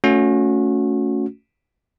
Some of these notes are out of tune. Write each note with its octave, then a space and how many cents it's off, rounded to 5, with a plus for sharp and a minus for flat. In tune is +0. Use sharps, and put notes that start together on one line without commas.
A3 +0 C#4 +10 F#4 -30